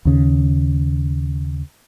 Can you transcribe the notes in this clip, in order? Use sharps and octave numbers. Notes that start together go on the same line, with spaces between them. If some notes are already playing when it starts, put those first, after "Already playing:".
D#2 C#3